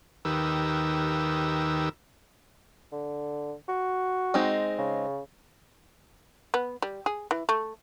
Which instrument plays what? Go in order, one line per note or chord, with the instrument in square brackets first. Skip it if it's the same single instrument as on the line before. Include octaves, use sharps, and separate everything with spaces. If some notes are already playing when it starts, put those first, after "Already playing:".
[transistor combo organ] D#2 D#3 G4 A#4 B4 E6
[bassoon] D3
F#4
[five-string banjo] G#3 C4 D#4
[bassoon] C#3
[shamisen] B3
G3
G#4
E3
A3